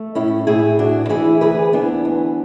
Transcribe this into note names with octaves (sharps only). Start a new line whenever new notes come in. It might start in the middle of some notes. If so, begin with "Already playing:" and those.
Already playing: A3
A2 C#4 E4
A2 E4 G#4
D2 D4 F#4
E3 E4 G#4
D2 G#4 B4
E3 B3 D4
D2